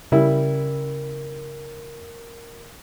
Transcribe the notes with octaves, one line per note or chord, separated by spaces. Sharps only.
C#3 G3 E4 A#4